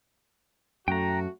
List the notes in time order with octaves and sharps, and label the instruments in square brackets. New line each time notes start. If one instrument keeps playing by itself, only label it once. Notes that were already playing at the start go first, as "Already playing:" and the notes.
[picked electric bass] F#2 [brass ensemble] A3 F#4 [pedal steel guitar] G5 A#5